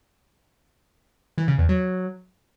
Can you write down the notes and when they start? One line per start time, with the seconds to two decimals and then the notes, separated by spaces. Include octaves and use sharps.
1.38 E3
1.48 C#3
1.58 E2
1.69 F#3